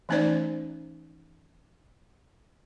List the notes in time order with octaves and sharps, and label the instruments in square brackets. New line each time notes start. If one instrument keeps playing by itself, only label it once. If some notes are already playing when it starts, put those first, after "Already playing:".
[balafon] E3 A3 C#4 D#4 C5 D5